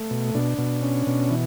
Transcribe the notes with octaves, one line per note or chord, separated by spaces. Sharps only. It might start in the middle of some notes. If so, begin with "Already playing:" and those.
Already playing: A3
B2
B2 D4
B2
C#4
B2
E3